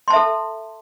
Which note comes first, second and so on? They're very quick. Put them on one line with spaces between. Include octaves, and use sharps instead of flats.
C6 A5 E5 A4